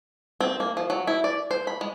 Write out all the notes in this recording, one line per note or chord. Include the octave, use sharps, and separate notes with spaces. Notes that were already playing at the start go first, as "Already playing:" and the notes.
C4
A#3
F3
F#3
E4
D5
C5
B5
G#3